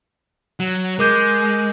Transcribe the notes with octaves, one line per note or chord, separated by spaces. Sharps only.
F#3
G#3 A#4 D6 G6